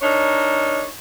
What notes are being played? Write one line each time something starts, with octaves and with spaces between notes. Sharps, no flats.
D4 D#4 A#4 C#5